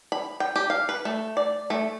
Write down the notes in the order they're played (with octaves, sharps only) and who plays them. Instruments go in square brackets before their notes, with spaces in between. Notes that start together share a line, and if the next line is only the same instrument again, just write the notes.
[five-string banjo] B5
G5
G4
F5
B4
A3
D5
A3